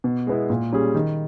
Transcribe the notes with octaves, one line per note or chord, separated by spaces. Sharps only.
B2
G#3 B3 E4
A#2
G3 C#4 G#4
D#3